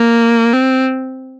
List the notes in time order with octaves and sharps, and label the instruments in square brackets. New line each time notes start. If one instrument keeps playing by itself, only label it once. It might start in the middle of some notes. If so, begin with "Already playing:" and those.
Already playing: [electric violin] A#3
C4